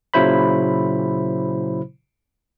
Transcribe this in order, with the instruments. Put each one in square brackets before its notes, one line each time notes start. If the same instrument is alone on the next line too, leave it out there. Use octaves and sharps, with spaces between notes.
[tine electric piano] A#2 C#3 F#3 E4 C5 B5